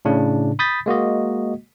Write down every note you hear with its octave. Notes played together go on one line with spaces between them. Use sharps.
A2 C#3 D4
B5 D#6 G6 A6 B6
G#3 A#3 F#4 D#5